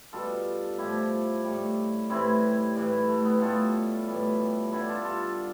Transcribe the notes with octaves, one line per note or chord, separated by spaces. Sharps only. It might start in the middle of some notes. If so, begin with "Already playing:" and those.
B2 G3 F4 A4
A2 F3 E4 G4
A2 G3
A2 E3 G3 C4 E4
A2 E3 G3
A3
B3
A2 G3 F4 A4
A2 E3 G3
G2 D3 G3 E4 G4
F4 A4
F4 A4